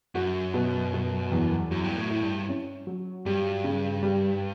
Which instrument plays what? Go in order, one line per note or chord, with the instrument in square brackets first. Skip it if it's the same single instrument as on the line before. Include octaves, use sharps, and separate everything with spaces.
[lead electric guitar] F#2 [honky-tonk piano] F#4
[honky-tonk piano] B2
B2
E2
[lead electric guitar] F#2 [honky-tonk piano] F#3
[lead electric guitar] G2
A2
[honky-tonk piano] E4
[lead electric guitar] G2
[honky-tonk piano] C#4
F#3
[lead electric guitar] G2 [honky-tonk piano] G3
[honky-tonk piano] C#3
G3